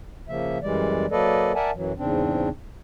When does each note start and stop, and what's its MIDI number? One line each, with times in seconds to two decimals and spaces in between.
0.29 0.58 49
0.29 0.58 53
0.29 0.58 58
0.29 0.58 76
0.62 1.06 42
0.62 1.06 52
0.62 1.06 55
0.62 1.06 56
0.62 1.06 74
1.11 1.52 54
1.11 1.52 58
1.11 1.52 69
1.11 1.52 71
1.11 1.52 74
1.11 1.52 75
1.55 1.71 70
1.55 1.71 74
1.55 1.71 76
1.55 1.71 78
1.55 1.71 80
1.55 1.71 81
1.75 1.93 42
1.75 1.93 52
1.75 1.93 54
1.98 2.49 40
1.98 2.49 44
1.98 2.49 49
1.98 2.49 60
1.98 2.49 62